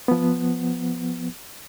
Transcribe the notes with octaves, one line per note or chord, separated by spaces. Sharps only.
F3 B3